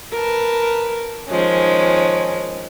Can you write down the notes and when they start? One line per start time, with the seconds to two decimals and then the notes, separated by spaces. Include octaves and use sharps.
0.13 A#4 B4 A5
1.27 D#3 F3 G#3 C#4